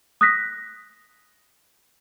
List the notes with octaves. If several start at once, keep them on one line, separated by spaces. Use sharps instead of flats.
D#6 F#6 A#6 B6